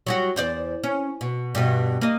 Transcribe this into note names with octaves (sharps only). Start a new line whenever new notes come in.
F#3 G3 F#4
E2 C5 D5
C#4
B2
G2 B2
A#3 D#5